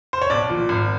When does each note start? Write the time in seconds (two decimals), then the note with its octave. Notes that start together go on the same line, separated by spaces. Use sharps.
0.13 C5
0.22 C#5
0.30 B1 D5
0.49 A#2 F3
0.69 G#1